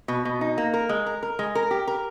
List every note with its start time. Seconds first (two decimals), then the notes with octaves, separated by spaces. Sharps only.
0.08 B2
0.25 B2
0.41 D#4
0.58 A#3
0.74 A#4
0.89 G#3
1.06 A#4
1.23 A#4
1.39 G#3
1.55 A#4
1.71 G4
1.87 A#4